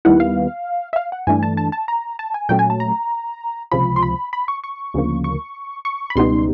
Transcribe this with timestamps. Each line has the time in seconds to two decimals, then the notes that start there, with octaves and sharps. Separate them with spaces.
0.05 D#2 D#3 G3 B3 E4 F#5
0.20 F5
0.93 E5
0.96 F5
1.12 F#5
1.27 G2 E3 A3 D4 G#5
1.43 A5
1.57 A5
1.72 A5
1.88 A#5
2.19 A5
2.34 G#5
2.49 A#2 F#3 A3 C#4 G5
2.59 G#5
2.70 A5
2.80 A#5
3.72 C#2 C3 F3 B5
3.96 C6
4.03 B5
4.33 B5
4.48 C#6
4.64 C#6
4.94 D2 C#3 F3 A#3
5.24 C#6
5.85 C#6
6.10 B5
6.16 C#2 B2 G3 B3 D#4 C6